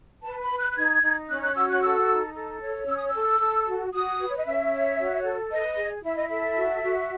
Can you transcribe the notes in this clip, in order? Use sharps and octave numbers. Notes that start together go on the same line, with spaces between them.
B4 A5
B5
B4
F#6
F#6
D#4 G#6
D#4
C#4 F#6
F#6
F#4 E6
F#6
A4 E6
D#4
A4
C#5
C#4 E6
D#6
E6
A4
A4
F#4
F#4 D#6
B4
C#5
D#5
C#4 E5
C#5
F#4
A4
B4 D#5
G#4
E4 E5
D#5
A4 E5
F#4
F#4